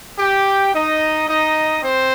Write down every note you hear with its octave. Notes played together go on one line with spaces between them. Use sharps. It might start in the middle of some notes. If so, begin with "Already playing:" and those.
G4 G5
D#4 D#5
D#4 D#5
C4 C5